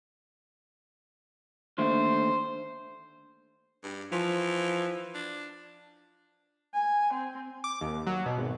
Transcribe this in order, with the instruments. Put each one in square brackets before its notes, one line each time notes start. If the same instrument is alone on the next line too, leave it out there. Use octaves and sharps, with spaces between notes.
[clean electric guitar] D#2 D3 A3 [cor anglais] C5
[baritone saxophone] G2
[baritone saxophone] E3 [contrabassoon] F3
[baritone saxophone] D4
[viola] G#5
C4
[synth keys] D6
D#2
F#3
B2
G#1